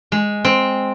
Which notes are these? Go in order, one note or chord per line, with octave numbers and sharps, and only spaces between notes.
G#3
C4